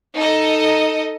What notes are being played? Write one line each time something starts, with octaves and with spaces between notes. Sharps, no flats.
D#4 A4 D#5